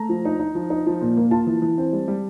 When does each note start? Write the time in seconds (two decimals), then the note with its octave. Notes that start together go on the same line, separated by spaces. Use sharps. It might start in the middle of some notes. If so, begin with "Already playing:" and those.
Already playing: A3 A#5
0.09 F3
0.25 D#4
0.39 D#4
0.55 F3
0.70 D#4
0.86 F3
1.01 A#2
1.17 A#3
1.31 F4 A5
1.47 E3
1.62 E3
1.78 C4
1.93 G3
2.08 G3